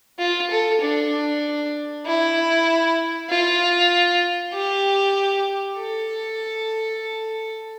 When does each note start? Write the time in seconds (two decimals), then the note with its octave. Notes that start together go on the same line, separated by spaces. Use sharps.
0.19 F4
0.50 A4
0.82 D4
2.06 E4
3.30 F4
4.54 G4
5.78 A4